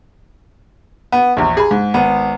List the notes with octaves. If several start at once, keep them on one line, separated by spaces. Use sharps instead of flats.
B3
A#1 E2
G#4 B5
G#2
G#1 B3